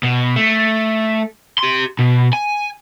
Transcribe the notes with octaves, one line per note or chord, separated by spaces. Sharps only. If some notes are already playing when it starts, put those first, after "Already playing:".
B2
A3
G4 C6
B2
G#5